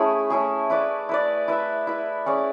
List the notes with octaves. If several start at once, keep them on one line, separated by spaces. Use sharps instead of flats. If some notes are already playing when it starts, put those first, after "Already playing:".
Already playing: A3 C#4 E4 G#4
A3 C#4 E4 G#4
E4 B4 D5
E4 B4 D5
E4 B4 E5
E4 B4 E5
C#4 G#4 D5